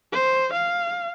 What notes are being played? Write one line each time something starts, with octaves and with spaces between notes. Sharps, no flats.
C5
F5